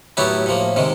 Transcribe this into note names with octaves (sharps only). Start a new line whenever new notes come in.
A2 F#3 B3 E4 G4
A2 F3 A#3
C3 D#3 G#3